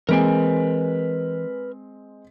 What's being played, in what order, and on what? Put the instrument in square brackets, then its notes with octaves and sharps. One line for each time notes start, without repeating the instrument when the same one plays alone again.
[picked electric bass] E3 A#3 [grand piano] G#3 C4 D7 [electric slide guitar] A#4 B4 G#5